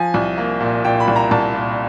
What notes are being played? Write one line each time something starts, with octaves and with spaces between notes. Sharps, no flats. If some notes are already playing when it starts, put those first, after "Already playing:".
Already playing: F3 G#5
C2
A#3
A#2
A#2 G5
B5
C2
A#5
C2 A5
A#2